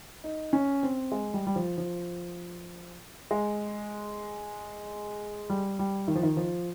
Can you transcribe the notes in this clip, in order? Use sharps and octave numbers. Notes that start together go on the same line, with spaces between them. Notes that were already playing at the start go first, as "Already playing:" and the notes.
D#4
C#4
C4
G#3
G3
G3
F3
F3
G#3
G3
G3
D#3
F3
D#3
F3